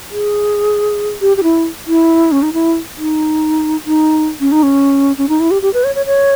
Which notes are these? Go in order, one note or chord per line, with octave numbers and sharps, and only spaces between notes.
G#4
G4
G4
E4
E4
C#4
D#4
E4
D#4
D#4
C#4
D#4
C#4
C#4
D#4
E4
G4
G4
B4
C#5
C#5
C#5